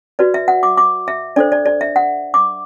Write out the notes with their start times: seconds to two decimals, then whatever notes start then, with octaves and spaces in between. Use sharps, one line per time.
0.19 F#4 B4 D5
0.34 E5
0.48 F#5
0.63 D6
0.77 D6
1.08 E5
1.36 D4 A4 C5 D5
1.52 D5
1.66 D5
1.81 E5
1.96 F#5
2.34 D6